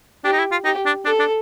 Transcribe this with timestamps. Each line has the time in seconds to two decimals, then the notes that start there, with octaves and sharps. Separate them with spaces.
0.24 D4 G4
0.33 D#4
0.39 E4
0.51 F4
0.65 D#4 G4
0.86 D4
1.05 D4 A4
1.20 D4